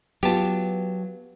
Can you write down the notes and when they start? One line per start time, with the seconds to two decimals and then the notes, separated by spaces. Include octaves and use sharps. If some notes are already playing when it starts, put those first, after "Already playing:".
0.23 F#3 B3 F4 G4 A5